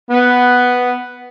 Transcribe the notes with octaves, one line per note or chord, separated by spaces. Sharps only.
B3